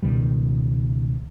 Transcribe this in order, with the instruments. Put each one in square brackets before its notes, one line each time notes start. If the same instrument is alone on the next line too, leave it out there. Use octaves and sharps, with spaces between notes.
[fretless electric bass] C#2 B2 D#3 G3